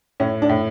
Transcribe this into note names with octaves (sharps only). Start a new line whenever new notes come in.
A2 C#4
D4
A2